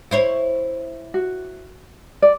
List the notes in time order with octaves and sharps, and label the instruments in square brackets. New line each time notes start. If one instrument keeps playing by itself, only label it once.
[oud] E4 C5 C#5
[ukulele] F#4
D5